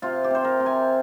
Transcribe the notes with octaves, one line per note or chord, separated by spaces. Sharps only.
C3 F4
G4
C3 C5
A#4
C3
G#5